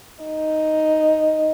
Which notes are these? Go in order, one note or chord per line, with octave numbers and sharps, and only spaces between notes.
D#4